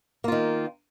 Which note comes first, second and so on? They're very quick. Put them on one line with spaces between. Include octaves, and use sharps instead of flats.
A#3 F4 D#3